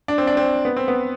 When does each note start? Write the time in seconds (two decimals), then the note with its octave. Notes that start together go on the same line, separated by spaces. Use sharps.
0.08 D4
0.18 C4
0.27 D4
0.37 C4
0.65 B3
0.76 C4
0.88 B3